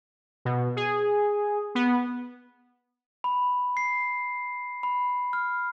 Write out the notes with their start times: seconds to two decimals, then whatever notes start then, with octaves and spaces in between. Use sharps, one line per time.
0.45 B2
0.76 G#4
1.75 B3
3.24 B5
3.77 C7
4.83 B5
5.33 F6